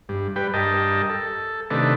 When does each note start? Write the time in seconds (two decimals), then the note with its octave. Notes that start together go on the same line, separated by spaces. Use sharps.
0.09 G2
0.36 G3 B4 G5
0.54 G2 A#4 D#5 G5 A5
1.10 A4
1.70 C3 D#3 A3 D4 A4 B4